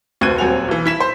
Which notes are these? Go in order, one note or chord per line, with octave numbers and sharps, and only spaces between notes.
F1 D2 C4 F#6 G#6 D#7
D#1 F#3 C4 F#5 G#5 F7
B1 E3
E4 B6 E7
C5